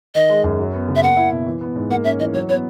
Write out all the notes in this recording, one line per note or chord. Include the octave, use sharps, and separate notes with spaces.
D#3 D#5
G#3
F#2
F#3
B3
C#3
E5
A#3 F#5
E4
B2
E3
B3
G#2
A#3 F#5
C#4 E5
E3 D#5
F#3 C#5
B3 C#5